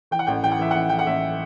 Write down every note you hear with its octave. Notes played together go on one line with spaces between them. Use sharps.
E3 G5
F#5
A1 G5
E3 G5
F#5
E3 E5
A1 F#5
E3 G5
F#5
A1 E5